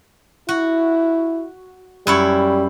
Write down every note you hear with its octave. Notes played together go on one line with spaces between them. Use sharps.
E4 F#4
F#2 G3 E4 C#5